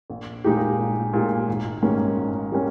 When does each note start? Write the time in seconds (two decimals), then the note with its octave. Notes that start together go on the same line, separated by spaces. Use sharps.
0.10 A#1
0.44 A#2 G#3 D#4 G4
0.79 A#1
1.13 A#2 G#3 D#4 G4
1.48 G#1
1.82 G#2 G3 A#3 C#4
2.17 G#1
2.52 G3 A#3 C#4